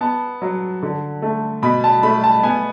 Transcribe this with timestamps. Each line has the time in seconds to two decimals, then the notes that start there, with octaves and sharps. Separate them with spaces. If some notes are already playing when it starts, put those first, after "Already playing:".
0.01 B3 A5
0.42 F#3
0.83 D3
1.22 A3
1.62 B2 B5
1.84 A5
2.03 A3 B5
2.24 A5
2.43 B3 G#5